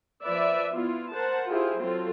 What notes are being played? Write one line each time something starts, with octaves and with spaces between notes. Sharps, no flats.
F3 B4 D5 E5
B3 E4 F4
A#4 C5 F#5 A5
E4 F4 G4 G#4 C5
F#3 C4 F4 A4